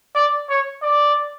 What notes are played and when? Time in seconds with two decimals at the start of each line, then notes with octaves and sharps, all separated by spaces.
0.16 D5
0.50 C#5
0.83 D5